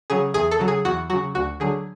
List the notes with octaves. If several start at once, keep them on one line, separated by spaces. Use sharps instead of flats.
C#3 F#3 G#4
E2 G#4
A4
C#3 F#3
G#4
E2 F#4
C#3 F#3 F#4
D2 F#4
D3 F#3 G#4